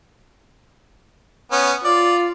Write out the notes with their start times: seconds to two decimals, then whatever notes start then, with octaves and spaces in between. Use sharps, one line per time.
1.52 B3 C#4
1.85 F4 D5